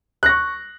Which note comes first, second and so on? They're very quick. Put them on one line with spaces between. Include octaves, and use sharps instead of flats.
F#6 A#6 C#6